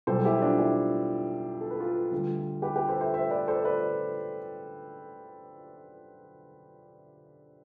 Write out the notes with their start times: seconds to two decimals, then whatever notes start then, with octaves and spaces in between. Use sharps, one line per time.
0.07 B1 B2 G3 A4 C5
0.24 E4 G4
0.42 D4 F4
0.59 E4 G4
1.61 A4
1.70 B4
1.80 F4 A4
2.12 D2 D3 G3
2.62 G4 B4
2.76 G4 B4
2.88 A4 C5
3.01 C5 E5
3.14 C5 E5
3.31 B4 D5
3.48 A4 C5
3.64 B4 D5